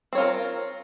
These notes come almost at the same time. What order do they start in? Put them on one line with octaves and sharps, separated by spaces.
C4 C#5 F4 A#4